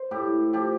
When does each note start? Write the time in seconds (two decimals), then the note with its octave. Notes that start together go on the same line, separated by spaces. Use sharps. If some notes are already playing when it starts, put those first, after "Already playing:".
Already playing: C5
0.11 A2 G4
0.53 F3 G4